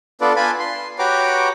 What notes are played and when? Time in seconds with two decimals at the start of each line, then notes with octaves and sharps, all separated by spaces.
0.21 B3 D4 F4 A4 B4 D5
0.36 F4 B4 G#5 A5 B5
0.60 C6
0.99 F#4 G4 B4 C#5 A#5 D6